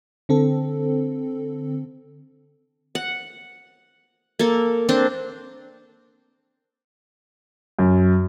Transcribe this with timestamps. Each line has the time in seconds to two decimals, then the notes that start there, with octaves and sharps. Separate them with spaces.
0.29 D3 C4 A4
2.95 F#5
4.39 A#3 A4
4.89 C4 D4 C5
7.79 F#2